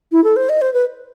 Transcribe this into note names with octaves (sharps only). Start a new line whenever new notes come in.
E4
A4
C5
D#5
C5
B4